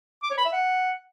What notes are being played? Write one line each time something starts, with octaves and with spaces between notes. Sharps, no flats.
D6
C#5
B5
E5
F#5